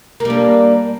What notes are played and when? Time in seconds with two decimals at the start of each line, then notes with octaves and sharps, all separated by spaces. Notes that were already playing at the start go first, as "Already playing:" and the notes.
0.20 A#3
0.25 G3
0.30 D4